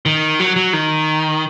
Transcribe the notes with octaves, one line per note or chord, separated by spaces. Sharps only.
D#3
F#3
F#3
D#3